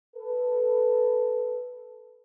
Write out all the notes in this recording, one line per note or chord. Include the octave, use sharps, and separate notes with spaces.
A4 B4